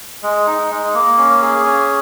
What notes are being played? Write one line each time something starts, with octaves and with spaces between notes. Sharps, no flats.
G#3
D#4
G#3
A#3
C#4
G#4
C#4